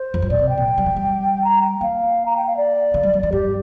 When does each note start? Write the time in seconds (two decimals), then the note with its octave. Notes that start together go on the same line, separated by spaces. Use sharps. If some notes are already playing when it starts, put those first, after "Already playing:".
Already playing: C5
0.14 F2
0.22 G2
0.30 A#2 D5
0.39 C3
0.49 G5
0.58 A#2
0.68 A#3
0.78 G3
0.86 F3
0.96 G3
1.44 A#5
1.62 G5
1.81 A#3 F5
2.25 A#5
2.36 G5
2.46 F5
2.57 D5
2.94 D3
3.03 G3
3.14 G3
3.23 F3
3.32 G2 G4